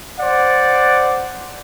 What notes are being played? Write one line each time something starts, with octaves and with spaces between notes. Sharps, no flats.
C5 D5 F#5